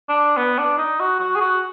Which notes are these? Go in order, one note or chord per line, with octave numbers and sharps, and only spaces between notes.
D4
B3
D4
D#4
F#4
F#4
G#4
F#4